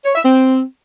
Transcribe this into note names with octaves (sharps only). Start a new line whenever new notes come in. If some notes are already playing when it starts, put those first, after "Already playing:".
C#5
E5
C4